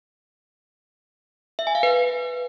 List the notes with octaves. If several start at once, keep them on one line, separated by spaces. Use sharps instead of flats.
E5
G#5
F5
B4